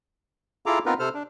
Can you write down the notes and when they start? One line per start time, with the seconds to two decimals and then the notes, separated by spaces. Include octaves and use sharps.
0.66 E4 F4 G#4 A4 A#5 D6
0.86 B3 C4 D#4 F4 A#4 B4
0.99 C3 A4 C5 F6
1.14 D4